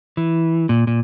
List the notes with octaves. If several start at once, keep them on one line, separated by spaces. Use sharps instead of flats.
E3
A#2
A#2